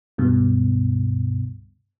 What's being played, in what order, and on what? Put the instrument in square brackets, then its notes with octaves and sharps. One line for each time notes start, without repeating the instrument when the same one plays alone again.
[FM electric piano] C#2 G2 B2